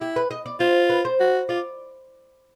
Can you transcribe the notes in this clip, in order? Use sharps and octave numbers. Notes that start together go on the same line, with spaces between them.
E4 G4
B4
D#5
D5
F4 C5
B4
C5
F#4
F4 D5